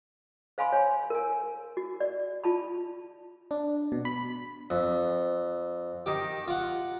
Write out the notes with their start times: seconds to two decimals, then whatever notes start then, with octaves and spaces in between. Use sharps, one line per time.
0.58 C5 F5 G#5 B5 C6
0.72 C#5 G#5
1.10 A#4 G#5
1.77 F#4
2.00 D5
2.44 F4 A5 B5
3.51 D4
3.92 B2
4.05 B5
4.70 F2
6.06 D#3 G4
6.48 F4 F#5